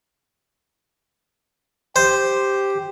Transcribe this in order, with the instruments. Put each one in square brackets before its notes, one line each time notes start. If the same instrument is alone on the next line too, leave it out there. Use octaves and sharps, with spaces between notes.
[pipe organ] G4 [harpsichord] C5